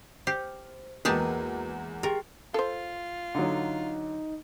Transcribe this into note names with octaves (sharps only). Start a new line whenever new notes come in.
G4 C5
E2 G#3 A#3 F#4 G4 B4 A5 A#5
G4 G#4 A#4 G5
F4 A4 C5
D3 F#3 D#4